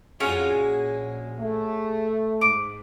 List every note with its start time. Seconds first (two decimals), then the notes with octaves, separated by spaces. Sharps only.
0.20 F2 A#2 G#3 C#4 F4 F#4 G#4
0.55 A#1
1.38 A3
2.41 G#2 D6